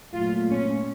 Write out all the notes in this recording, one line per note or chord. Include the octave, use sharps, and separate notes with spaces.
A#2 F#3 A3 F4
C#4